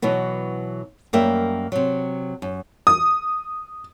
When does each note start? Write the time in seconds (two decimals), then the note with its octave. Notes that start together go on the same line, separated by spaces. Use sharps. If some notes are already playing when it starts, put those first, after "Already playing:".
0.02 B2 E3 F#3 B3
1.13 F#2 G3 A#3 E5 G5
1.72 C3 F#3
2.42 F#2
2.87 D#6